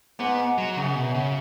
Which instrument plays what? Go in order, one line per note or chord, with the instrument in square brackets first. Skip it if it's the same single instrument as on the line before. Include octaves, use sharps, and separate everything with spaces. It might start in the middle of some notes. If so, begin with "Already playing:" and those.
[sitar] G#2 [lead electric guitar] B3
[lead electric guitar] F#3
[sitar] F#2 [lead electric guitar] C#3
[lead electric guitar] B2
C#3